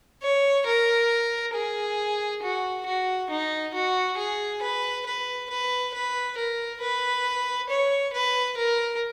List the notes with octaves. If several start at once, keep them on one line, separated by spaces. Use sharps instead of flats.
C#5
A#4
G#4
F#4
F#4
D#4
F#4
G#4
B4
B4
B4
B4
A#4
B4
C#5
B4
A#4